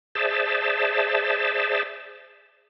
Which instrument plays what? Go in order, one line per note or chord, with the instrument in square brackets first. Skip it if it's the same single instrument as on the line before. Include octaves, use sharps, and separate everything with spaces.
[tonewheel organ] G#4 C5 D5 E5 A5